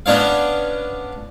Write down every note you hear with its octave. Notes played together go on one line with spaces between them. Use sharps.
B3 C#4 D4 C#5 F5